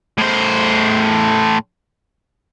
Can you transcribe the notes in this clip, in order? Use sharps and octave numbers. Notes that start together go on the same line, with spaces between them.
A2 C5